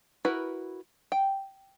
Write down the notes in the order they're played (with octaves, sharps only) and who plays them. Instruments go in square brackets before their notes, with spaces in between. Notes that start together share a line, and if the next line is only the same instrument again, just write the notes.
[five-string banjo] E4 F#4 A#4 B4
G5